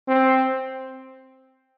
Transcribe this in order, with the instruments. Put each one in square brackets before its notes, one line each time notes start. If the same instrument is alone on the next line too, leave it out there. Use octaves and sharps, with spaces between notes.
[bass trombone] C4